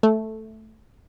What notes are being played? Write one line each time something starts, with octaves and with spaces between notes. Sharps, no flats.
A3